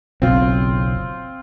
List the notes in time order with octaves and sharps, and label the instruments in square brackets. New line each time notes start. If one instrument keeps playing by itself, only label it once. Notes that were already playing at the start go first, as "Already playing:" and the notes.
[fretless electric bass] F#1 B1 [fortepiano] C4 F4